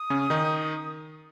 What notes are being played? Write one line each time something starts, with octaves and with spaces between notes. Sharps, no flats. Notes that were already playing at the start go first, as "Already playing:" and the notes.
Already playing: D#6
C#3 C#4
D#3 D#4